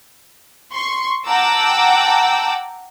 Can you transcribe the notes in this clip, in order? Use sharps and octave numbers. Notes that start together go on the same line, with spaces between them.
C6 C#6
F#5 G5 A5 A#5 D6 E6